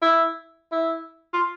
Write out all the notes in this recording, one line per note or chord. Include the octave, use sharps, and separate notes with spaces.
E4
E4
F4